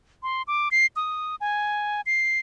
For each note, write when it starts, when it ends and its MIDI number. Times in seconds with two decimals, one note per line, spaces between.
0.23 0.42 84
0.47 0.69 86
0.71 0.86 96
0.96 1.35 87
1.41 2.01 80
2.06 2.39 96